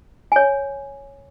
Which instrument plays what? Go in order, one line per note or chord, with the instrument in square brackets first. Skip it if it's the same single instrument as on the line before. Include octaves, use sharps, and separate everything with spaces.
[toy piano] C#5 G#5